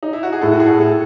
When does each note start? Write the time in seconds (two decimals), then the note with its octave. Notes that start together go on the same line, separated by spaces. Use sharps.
0.03 D#4
0.13 E4
0.23 F#4
0.32 G#4
0.41 A2 A4
0.52 F#4
0.60 G#4
0.66 A4
0.79 A2 A4